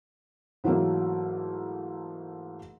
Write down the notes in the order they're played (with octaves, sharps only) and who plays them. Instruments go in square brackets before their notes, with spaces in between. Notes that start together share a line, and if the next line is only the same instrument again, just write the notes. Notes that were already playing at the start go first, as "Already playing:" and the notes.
[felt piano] G#2 E3 F#3 A3 A#3